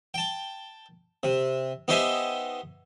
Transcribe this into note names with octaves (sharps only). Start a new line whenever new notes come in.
G5 A5
C3
B3 D#4 G4 C5 E5 G#5